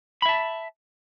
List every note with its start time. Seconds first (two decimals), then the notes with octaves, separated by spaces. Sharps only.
0.22 B5
0.26 E5
0.29 A5